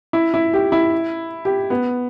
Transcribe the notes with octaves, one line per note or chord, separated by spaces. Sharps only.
E4
E4
G4
E4
G4
B3